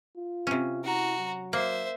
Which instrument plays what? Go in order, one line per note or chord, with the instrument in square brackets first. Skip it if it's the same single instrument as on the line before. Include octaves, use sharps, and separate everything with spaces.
[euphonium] F4
[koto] C3 C#4
[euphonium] E4 [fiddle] F#4 A#5
[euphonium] F#3
[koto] A#3 [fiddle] C5 E5